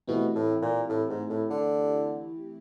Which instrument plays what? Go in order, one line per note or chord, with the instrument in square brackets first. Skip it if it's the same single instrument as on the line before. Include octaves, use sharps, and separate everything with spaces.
[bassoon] B2 [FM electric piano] E3 A3 C4 E4 G4
[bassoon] A2
A#2
A2
G#2
A2
D3